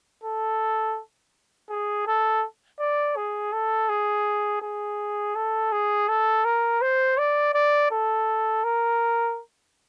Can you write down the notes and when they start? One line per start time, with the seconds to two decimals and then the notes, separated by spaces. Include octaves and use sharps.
0.23 A4
1.70 G#4
2.07 A4
2.79 D5
3.16 G#4
3.53 A4
3.89 G#4
4.62 G#4
5.35 A4
5.72 G#4
6.08 A4
6.45 A#4
6.82 C5
7.18 D5
7.54 D5
7.91 A4
8.64 A#4